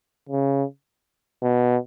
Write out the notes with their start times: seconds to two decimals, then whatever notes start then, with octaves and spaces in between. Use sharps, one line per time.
0.29 C#3
1.43 B2